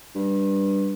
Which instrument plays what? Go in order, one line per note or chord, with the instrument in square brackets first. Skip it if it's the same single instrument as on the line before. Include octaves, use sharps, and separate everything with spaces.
[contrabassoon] G2